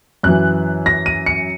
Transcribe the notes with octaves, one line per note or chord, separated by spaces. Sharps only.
F#2 E3 F#6
A#6
D#7
C#7